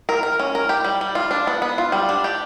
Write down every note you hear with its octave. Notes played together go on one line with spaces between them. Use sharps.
A#4
A#4
C#4
A#4
G4
G3
G3
F4
D4
B3
B3
F4
G3
D4
G4